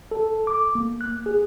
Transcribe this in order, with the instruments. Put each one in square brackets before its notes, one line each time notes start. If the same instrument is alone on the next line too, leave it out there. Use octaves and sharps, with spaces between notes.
[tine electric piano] A4
D6
A#3
F#6
G#4